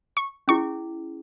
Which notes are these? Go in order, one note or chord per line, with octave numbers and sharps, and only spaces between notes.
C#6
C#4 E4 G#4 C#6